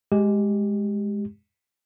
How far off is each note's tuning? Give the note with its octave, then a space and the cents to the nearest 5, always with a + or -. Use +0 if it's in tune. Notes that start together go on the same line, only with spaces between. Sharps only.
G#3 +0 G4 +0